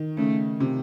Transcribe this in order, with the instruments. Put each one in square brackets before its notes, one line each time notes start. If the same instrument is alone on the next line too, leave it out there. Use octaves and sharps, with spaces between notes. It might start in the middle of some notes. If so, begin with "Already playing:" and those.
Already playing: [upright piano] D#3
[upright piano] C#3 [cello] A3
[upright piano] C3